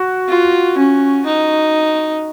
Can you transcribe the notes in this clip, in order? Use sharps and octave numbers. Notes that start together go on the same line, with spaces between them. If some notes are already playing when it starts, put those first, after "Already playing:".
Already playing: F#4
F4
C#4
D#4